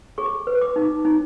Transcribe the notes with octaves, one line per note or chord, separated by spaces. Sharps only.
G#4 C#6
B4
D6
D#4
D#4